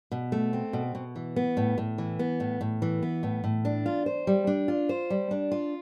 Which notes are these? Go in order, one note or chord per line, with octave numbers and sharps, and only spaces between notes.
B2
A3
C4
B2
B2
E3
B3
A2
A2
E3
B3
A2
A2
E3
B3
A2
A2
D4
F4
C5
G3
D4
F4
C5
G3
D4
F4